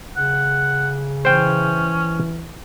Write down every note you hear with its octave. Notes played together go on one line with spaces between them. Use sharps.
C#3 F#5
E3 C#4 C5 G5